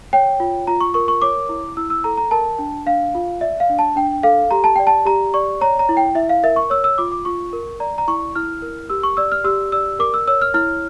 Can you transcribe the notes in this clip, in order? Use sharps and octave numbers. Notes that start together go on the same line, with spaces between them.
C#5 G5
F4
F4 A#5
C#6
A#4 C#6
C#6
C#5 D6
E4
E4 E6
E6
A4 A#5
A#5
A#4 A5
D4
D4 F5
F4
D5 E5
F5
D4
A5
D4 G5
A4 F5
G4 A#5
A5
D5 G5
A5
G4 A#5
D5 C#6
C#5 A#5
A#5
E4
G5
E4 E5
F5
A#4 E5
C#6
C#5 E6
E6
F4 D6
D6
F4 C#6
A#4
D5 A#5
A#5
E4 C#6
E4 F6
A#4
G4 E6
C#6
D5 E6
F6
G4 E6
D5 E6
A#4 D6
E6
C#5 E6
F6
E4 F6